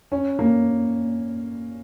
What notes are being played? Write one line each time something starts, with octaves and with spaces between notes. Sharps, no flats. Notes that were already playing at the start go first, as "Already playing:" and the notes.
C#4
A#3